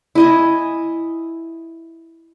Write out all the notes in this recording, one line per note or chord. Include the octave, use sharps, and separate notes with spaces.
E4 D#5 G#5